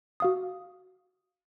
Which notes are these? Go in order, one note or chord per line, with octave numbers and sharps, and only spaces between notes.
F#4 F5 D#6